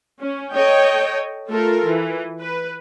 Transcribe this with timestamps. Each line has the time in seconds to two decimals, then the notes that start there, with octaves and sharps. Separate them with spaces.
0.20 C#4
0.54 A4 C#5 D#5 G5
1.48 A3 F4 A4 A#4
1.84 E3
2.41 B4